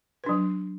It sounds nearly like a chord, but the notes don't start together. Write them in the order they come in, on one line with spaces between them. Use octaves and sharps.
B4 D4 F#3